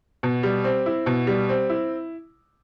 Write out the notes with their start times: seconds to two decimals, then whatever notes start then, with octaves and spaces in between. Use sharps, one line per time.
0.23 B2
0.43 G3
0.64 C4
0.86 E4
1.06 B2
1.27 G3
1.49 C4
1.70 E4